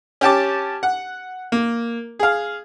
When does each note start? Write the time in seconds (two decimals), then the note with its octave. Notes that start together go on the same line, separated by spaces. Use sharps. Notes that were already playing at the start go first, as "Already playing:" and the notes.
0.21 C#4 G4 A5 D6
0.83 F#5
1.52 A#3
2.19 G#4 F5